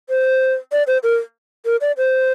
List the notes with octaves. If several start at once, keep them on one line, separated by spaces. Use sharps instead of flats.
C5
D5
C5
A#4
A#4
D5
C5